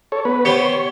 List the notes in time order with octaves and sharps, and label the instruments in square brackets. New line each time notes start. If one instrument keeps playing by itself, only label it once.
[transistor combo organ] A4 C#5
B3 B4
[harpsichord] B3 G4 C5 [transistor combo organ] C#5